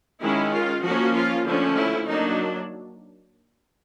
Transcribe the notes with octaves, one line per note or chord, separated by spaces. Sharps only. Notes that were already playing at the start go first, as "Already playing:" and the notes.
D#3 G#3 C#4 E4
F4
F3 A#3 C#4 F#4
F4
D3 F3 A3 C#4
E4
F#3 A#3 D4 D#4